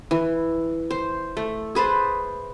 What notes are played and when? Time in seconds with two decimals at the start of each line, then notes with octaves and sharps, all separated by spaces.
0.11 E3
0.91 C5
1.37 A3
1.75 G#4 B4 C5 A5